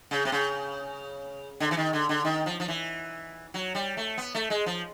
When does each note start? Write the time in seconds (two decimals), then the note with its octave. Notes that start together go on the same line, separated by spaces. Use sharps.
0.11 C#3
0.25 C3
0.32 C#3
1.60 D3
1.71 E3
1.77 D#3
1.93 D3
2.09 D3
2.25 D#3
2.46 F3
2.60 F3
2.68 E3
3.54 F#3
3.75 G3
3.97 A3
4.18 B3
4.35 A3
4.50 G#3
4.66 F3